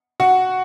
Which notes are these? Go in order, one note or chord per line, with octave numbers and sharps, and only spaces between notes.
F#4 F#5